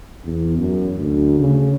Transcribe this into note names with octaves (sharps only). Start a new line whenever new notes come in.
E2
F#2
D2
C#3